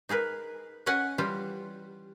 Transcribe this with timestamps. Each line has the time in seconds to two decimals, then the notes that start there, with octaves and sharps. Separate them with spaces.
0.09 D#4 G#4 A#4 B4
0.86 C#4 B4 D#5 F#5 G#5
1.18 E3 G3 F4 G4